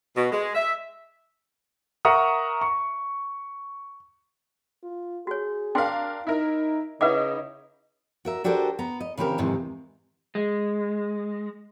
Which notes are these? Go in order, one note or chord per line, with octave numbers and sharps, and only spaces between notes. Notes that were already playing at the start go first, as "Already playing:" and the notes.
B2
G#3
E5
A#4 E5 F#5 A#5 C#6 D#6
C#6
F4
F#4 G#4 C#5
D4 A#4 F5 G5 C6
D#4 E4 A#4
C#3 D#4 E4 B4 C#5 F#5 D6
F#4 A#4 E5
D4 F#4 G4 A4 A#4 C5
B3 A#5
D#5
C#3 E3 C4 G4 A#4
F2 G#2 C3 D#3 E3
G#3